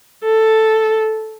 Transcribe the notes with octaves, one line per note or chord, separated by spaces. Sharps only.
A4